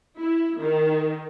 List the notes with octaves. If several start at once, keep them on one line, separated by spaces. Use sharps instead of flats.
E4
D#3